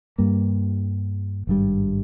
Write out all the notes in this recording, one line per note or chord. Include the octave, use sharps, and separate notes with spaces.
G2 G3 A#3
G#1 G2 G3